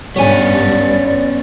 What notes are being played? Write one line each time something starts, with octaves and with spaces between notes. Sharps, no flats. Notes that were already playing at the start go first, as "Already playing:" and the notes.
G2 B3 C#4 C#5 D5 G#5